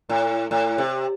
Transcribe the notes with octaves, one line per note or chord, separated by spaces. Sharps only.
A2
A2
C3